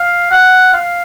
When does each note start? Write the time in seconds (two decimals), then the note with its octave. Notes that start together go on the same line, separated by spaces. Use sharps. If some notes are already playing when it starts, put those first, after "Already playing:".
Already playing: F5
0.31 F#5
0.73 F5